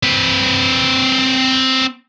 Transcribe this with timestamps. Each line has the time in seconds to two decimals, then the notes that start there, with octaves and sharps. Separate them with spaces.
0.03 C4 B4